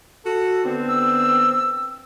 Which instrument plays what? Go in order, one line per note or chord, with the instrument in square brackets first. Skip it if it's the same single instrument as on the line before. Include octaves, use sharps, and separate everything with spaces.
[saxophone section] F#4 A4
D3 B3 C4
[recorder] E6